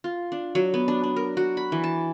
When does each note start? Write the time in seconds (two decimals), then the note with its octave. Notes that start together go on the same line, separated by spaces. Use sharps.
0.04 F4
0.32 D4
0.55 F#3
0.74 B3
0.88 D4
1.04 D4
1.16 A#4
1.37 F#4
1.57 B5
1.72 E3
1.84 A5